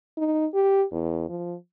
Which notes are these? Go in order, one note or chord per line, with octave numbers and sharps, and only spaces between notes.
D#4
G4
E2
F3